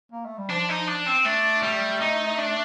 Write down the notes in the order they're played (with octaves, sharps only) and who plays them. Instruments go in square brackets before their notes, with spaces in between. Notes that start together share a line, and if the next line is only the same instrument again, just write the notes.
[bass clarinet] A#3
A3
G3
[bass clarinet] F3 [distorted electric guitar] D4
[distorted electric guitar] D#4
D4
C4
[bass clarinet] A3 [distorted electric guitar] D4
[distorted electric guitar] G3
D#4
D4